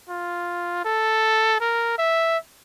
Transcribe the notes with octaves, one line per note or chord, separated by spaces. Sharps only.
F4
A4
A#4
E5